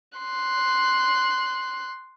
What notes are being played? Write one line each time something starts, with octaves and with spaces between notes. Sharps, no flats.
C6 F#6